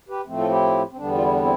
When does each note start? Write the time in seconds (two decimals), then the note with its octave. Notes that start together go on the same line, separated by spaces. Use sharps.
0.09 G4 B4
0.26 A2 F3 A3 C4
0.38 F4 A4
0.50 E4 G4
0.91 C4
0.97 E2 D3 G3 B3 D4
1.14 F4
1.22 E4
1.31 D4
1.41 C4 E4